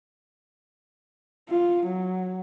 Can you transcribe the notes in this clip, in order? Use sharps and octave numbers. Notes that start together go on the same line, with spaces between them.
F4
F#3